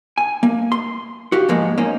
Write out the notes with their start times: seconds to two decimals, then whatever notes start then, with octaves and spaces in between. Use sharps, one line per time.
0.18 G#5
0.43 A#3
0.72 C6
1.32 F#4 G4 F5
1.49 G#2 F3 G#3 A#3
1.78 A#3 C#4 D#4 C5